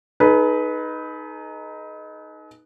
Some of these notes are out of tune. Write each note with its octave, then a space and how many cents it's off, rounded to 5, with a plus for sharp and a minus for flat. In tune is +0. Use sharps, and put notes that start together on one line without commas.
D#4 +0 G#4 +45 B4 -5